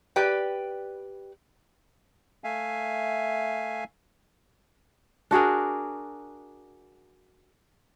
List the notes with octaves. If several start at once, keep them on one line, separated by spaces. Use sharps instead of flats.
G4 B4 D5 G5
A3 E5 F5 G#5
D4 F#4 G#4 A#4